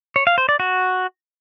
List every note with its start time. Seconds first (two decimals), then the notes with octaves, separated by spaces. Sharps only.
0.16 C#5
0.27 F5
0.38 C5
0.49 D5
0.60 F#4